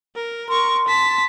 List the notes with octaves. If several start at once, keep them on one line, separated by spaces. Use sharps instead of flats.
A#4
A#4 C6 C#6
A5 B6